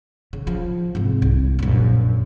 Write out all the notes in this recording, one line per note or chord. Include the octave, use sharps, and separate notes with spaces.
C#3
F3
G#2 C3
C2
A#1 F#2